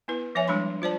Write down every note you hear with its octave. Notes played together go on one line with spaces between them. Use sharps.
B3 E4 B4
F3 C#5 E5 G#5
G3 G#3 D4 B5 C6
F4 C5 D5 A5